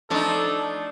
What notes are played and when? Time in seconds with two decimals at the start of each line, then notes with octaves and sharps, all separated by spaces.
0.10 F3 A3 D4 D#4 A4 G#5